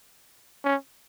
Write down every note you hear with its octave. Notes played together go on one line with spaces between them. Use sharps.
C#4